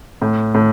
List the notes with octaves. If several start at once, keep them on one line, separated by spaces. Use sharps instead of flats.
A2
A2